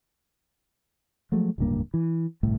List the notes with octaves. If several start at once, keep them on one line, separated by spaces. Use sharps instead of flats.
F3 F#3 G#3 A3
D1 C#2 G2 A#3
E3
G1 C2 A2